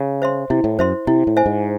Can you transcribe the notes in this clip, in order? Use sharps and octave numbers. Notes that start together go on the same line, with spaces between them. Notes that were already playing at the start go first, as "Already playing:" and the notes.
Already playing: C#3
C5 E5 C6
C3 E4
A2
F#2 C5 E5 C6
C3 E4
A2
C5 E5 G#5
G#2